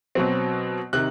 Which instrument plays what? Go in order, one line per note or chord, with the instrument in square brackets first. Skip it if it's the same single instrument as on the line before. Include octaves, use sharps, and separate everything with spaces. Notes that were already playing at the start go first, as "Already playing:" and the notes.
[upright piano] B2 F#3 C4
C3 D#3 F#6